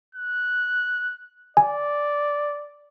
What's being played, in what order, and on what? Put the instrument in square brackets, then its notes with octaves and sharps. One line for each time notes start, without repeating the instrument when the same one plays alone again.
[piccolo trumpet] F#6
[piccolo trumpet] D5 [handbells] G#5